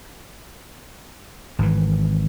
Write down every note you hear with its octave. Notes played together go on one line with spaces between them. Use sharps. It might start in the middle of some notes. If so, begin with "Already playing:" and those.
G#1 E3